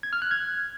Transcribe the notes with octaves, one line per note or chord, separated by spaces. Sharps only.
G#6
F6
F#6
G#6